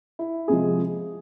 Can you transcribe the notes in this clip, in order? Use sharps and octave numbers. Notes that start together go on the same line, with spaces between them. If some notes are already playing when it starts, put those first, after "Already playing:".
E4
C3 F3 G#3 G#4